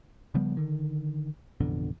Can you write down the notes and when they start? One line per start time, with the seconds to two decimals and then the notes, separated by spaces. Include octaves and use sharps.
0.34 C#3 F3 G3 B3
0.57 D3 D#3
1.60 A1 F2 B2 D3